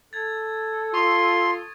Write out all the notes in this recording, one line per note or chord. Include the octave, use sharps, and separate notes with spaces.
A4 G#6 A6
F4 C6 C#6 D#6